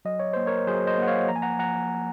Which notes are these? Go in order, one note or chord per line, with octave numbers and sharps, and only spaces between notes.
F#3 D#5
C#5
A#3 C5
A#4 C#5
F#3 G#4 C5
C5 D#5
A#3 F#5
C#5 F5
F3 A#5
G#5
F#5 A#5
F3 F#5 A#5